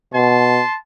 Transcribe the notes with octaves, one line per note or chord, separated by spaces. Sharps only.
B2 A5 C6